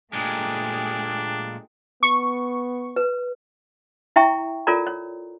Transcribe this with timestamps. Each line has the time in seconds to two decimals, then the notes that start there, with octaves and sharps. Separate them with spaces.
0.13 A#2 G#3 A3 D4 G4 G#4
2.03 B3 C#6
2.96 B4
4.16 E4 E5 G5 A#5 C#6
4.67 F4 A4 A#4 C#5 D5 A#5
4.87 C#5